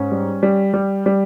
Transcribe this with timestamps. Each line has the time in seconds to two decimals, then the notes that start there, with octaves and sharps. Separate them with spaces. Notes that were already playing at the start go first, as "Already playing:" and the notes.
Already playing: G#2 C#4
0.12 G3
0.43 G3
0.74 G3
1.06 G3